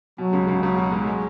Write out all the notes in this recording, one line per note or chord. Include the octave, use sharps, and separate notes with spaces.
B2 F#3
C#2 C#3
C#2 C#3
C#2 C#3 F#3
B2
G#2 G#3
G#3